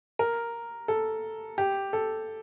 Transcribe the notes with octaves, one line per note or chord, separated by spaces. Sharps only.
A#4
A4
G4
A4